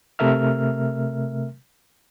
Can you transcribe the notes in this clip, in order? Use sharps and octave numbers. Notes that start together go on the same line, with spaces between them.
C3 A3 A#4 E5 F6